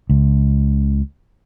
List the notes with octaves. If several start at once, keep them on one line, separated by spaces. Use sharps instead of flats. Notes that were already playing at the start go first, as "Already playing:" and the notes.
C#2